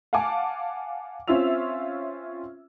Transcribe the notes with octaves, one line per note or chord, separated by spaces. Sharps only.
F5 F#5 G#5 A5 D6
C4 C#4 F4 E5 E6 F7